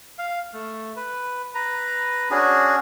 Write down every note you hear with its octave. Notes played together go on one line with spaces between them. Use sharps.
F5
A3
B4
B4 A#5
C#4 D4 F#4 G#4